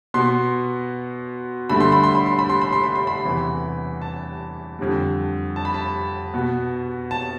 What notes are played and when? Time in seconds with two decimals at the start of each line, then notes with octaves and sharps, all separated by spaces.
0.14 B2 B3 C6
1.69 G2 D3 A3 B5
1.80 C6
1.92 B5
2.04 C6
2.15 B5
2.26 C6
2.39 B5
2.50 C6
2.61 B5
2.73 C6
2.84 B5
2.96 C6
3.07 B5
3.24 E2 C3 E3
4.02 A5
4.79 F2 D3 G3
5.56 A5
5.65 B5
5.74 A5
6.34 B2 B3
7.11 A5